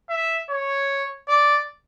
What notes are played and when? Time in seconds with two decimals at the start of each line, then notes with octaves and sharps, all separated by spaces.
0.10 E5
0.50 C#5
1.28 D5